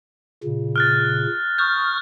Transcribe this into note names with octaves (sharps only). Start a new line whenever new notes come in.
A#2 C#3
F6 F#6 A6
C#6 D#6 F6 G6